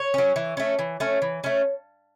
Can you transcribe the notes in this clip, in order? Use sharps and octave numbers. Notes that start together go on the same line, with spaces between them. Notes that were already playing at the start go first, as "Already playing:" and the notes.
Already playing: C#5
F#3 C#4
E3
A3 C#4
E3
A3 C#4
E3
A3 C#4